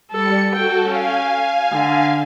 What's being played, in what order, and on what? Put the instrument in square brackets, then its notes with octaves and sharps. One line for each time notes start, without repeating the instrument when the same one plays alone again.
[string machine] G3 C#7 [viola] A4
[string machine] F#4 A4 [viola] G5
[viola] C#4 [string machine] F5 G#5
[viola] D3